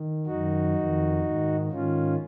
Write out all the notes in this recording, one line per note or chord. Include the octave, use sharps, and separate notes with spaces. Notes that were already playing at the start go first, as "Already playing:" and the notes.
Already playing: D#3
F#2 D#3 D#4 F#4
F2 D#3
G#2 D#3
G#2 D#3 C#4 F4